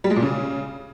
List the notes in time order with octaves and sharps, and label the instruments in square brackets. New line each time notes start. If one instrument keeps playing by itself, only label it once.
[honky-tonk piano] G3
G#3
A#2
C#3